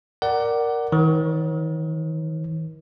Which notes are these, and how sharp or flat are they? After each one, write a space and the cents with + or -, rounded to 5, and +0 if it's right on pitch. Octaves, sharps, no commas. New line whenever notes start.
A#4 +0 D5 +0 F#5 +20
D#3 +40 C#5 -45